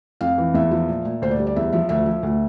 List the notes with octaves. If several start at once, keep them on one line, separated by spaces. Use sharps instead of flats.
F2 F5
E3
E2 E5
F3
A#2
A#2
D2 C5
D5
G3
D5
E2 E5
F3 E5
D2 E5
F3
D2